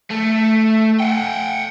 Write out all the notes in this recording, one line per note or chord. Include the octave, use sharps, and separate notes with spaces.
A3
F#5 G5